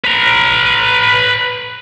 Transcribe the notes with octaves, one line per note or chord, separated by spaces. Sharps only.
B4 A#5